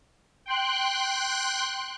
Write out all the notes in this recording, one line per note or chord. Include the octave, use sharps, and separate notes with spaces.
G5 C6 F#6